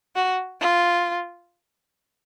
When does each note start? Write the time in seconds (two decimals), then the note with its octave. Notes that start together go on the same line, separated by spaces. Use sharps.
0.15 F#4
0.61 F4